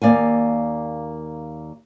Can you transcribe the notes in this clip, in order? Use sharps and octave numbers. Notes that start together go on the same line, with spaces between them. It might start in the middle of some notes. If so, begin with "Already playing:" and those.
D#2 A#3 D5 F5 G#5